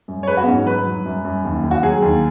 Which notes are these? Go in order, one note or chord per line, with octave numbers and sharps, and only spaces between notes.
F#2
C#5
G#3 B4
F#4
B3
G#2 C#4
F#3 B4
F#3
F#2
F#2
D#2
D#2
F#4
F#3 G#4
D#2